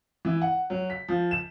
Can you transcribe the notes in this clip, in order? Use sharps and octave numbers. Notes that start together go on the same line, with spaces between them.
E3
F#5
F#3
B6
F3
E7